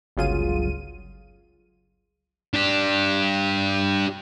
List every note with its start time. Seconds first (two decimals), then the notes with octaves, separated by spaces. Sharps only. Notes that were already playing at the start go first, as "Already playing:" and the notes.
0.17 G1 C#2 F#3 F4 G#4 D#7
2.54 D4 G4